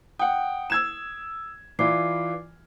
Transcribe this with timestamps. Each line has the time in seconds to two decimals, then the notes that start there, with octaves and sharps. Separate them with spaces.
0.19 F#5 G5 D#6
0.70 E6 G#6 E7
1.79 E3 E4 F4 D5 D6 C7